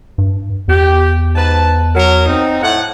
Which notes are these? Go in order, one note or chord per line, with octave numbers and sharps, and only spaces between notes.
G2
E2 G4
G#2 B4 A5
F#3 A#4
C4 D#4
A2 F#5